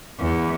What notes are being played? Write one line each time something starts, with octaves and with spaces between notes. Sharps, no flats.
E2